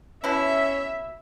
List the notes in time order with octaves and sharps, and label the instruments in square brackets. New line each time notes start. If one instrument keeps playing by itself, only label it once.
[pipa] B2 E4 [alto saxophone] C#4 [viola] E5